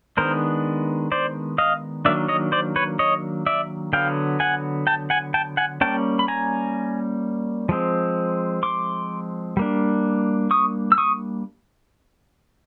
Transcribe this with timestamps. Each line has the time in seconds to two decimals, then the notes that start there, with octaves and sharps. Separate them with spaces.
0.17 D#3 G#3 B3 D4 A#4 C5
1.12 C5 D5
1.58 D#5 F5
2.05 D#3 F#3 A#3 D4 D5 E5
2.28 C#5 D#5
2.52 C5 D5
2.76 B4 C#5
2.99 C#5 D#5
3.46 D5 E5
3.93 D3 F#3 B3 F5 G5
4.40 F#5 G#5
4.87 G5 A5
5.10 F#5 G#5
5.34 G5 A5
5.57 F#5 G#5
5.81 G3 A#3 C#4 G5 A5
6.19 B5
6.28 G#5 A#5
7.69 F3 G#3 C4
8.63 C6 D6
9.57 G3 A#3 D4
10.51 C#6 D#6
10.92 E6
10.98 C#6 D#6